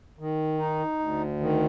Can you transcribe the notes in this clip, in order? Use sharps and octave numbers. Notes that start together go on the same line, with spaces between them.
D#3
D#4
D2
D#3